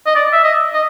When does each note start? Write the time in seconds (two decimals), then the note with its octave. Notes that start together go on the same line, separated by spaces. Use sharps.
0.06 D#5
0.16 D5
0.33 E5
0.44 D#5
0.73 D#5